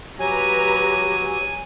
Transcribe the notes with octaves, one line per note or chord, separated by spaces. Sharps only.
F#3 G4 B4 G#5 A#5